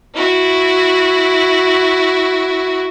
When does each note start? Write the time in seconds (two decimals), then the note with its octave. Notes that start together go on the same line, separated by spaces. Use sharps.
0.15 E4 F#4